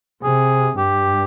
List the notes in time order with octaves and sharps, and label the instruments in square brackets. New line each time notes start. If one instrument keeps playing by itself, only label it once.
[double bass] C3 [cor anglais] G#4
[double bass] G2 [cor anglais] G4